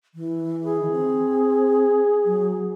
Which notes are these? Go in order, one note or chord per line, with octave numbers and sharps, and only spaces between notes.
E3
G#4
D#3
C4
F#3